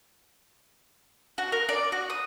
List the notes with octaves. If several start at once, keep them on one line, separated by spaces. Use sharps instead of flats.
F#4
A#4
D5
F#4
D#6